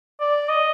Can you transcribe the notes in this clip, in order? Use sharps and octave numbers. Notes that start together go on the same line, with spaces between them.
D5
D#5